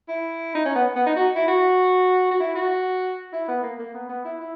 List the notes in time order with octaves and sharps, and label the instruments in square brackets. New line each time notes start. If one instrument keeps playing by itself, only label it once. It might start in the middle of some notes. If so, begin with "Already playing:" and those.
[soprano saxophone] E4
D#4
C#4
B3
B3
D#4
F#4
E4
F#4
F#4
E4
F#4
E4
B3
A#3
A#3
B3
B3
E4
E4